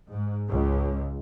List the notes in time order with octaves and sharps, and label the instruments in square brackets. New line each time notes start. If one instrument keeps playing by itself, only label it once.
[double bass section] G#2
C#2